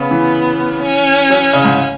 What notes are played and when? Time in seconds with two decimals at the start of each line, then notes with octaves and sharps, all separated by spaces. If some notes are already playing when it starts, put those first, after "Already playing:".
Already playing: C#3 B3
0.11 E3
0.82 C#4
1.30 F#3
1.53 C#3
1.65 G#2